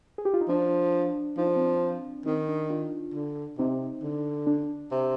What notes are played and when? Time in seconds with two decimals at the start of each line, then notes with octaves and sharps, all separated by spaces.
0.18 G#4
0.25 G4
0.34 F4
0.41 D#4
0.49 F3 D4
1.38 F3 D#4
1.47 D4
1.56 C4
1.65 D4
2.26 D#3 C4 D#4
2.48 D4
2.70 D4 F4
3.14 D3
3.58 C3 C4 D#4
4.03 D3
4.47 D4
4.91 C3